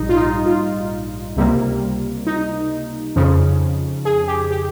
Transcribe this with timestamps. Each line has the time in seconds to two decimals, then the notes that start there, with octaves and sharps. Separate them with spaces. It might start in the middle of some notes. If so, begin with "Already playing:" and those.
Already playing: A#1 G#2 G3 D#4
0.09 F4
0.16 D#4
0.46 F4
1.36 C#2 C3 G3 A#3
2.27 D#4
3.16 F2 C#3 F3
4.05 G#4
4.28 G4
4.51 G4